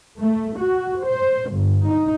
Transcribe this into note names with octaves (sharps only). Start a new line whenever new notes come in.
A3
F#4
C5
G1
D#4